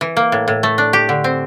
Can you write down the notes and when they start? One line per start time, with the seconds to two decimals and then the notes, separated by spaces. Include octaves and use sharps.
0.01 E3
0.17 A#3
0.32 A2
0.48 A2
0.63 A3
0.78 D4
0.93 G4
1.09 D3
1.24 C4